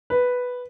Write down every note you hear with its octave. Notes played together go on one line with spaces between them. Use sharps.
B4